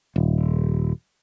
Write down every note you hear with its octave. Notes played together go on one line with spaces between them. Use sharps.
D#1